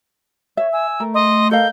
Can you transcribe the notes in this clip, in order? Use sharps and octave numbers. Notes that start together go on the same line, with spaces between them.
C#5 E5
G#5 E6
A3 A#4
D#5 C6
A4 A#4 D#5 F5 G6